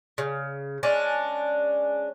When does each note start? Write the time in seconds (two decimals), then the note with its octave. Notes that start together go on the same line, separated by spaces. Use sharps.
0.18 C#3
0.83 G#3 C#4 D4